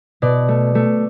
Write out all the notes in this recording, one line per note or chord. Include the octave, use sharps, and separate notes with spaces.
B2 D5
A3
A3